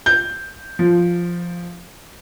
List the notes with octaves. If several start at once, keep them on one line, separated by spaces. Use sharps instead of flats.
G6
F3